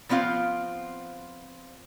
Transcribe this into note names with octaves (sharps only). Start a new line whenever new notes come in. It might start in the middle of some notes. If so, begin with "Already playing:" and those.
F3 B3 C4 F4 F5